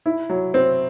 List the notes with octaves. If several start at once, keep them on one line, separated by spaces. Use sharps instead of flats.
E4
F#3
C4